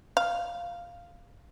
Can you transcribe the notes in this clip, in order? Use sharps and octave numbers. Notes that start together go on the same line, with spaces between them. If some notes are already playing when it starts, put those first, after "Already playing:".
F5